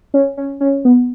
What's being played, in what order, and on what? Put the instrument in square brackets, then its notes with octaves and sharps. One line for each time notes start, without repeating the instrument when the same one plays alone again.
[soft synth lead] C#4
C#4
C#4
B3